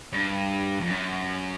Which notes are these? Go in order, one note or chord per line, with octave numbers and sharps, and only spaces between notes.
G2
F2
F#2